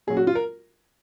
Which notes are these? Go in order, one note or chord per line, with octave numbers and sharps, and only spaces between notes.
A#2 F#3 C#4 G#4
F#4
F4
A#4